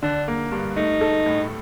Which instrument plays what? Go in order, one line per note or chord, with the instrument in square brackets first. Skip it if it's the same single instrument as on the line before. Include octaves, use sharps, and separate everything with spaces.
[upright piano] D3 [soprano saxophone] D4
[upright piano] A#3
G2
[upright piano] A3 [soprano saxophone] D#4
[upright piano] A4
A2